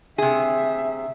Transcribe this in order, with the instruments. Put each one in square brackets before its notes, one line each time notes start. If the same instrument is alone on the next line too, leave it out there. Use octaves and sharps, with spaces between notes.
[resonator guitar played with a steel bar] C3 G#4 [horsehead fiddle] E5